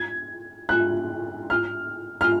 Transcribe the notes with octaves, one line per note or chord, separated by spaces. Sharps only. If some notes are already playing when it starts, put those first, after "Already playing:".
Already playing: G#6
F#6
F6
F6